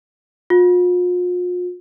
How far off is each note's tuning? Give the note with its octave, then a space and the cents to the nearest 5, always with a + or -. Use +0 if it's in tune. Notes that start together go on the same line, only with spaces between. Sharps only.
F4 +40